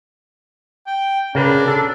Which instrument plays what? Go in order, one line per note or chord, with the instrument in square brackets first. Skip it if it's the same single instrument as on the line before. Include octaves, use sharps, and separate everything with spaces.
[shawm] G5
[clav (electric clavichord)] C#3 A#4 B4 [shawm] D4
[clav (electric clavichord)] A4